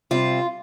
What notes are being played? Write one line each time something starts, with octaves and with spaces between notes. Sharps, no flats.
C3 G3 C4 F4